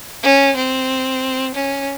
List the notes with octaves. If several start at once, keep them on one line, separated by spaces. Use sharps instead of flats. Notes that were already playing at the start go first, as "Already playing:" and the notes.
C#4
C4
C#4